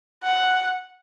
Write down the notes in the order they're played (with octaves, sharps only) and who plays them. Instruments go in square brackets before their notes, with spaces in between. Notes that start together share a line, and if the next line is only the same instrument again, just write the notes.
[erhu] F#5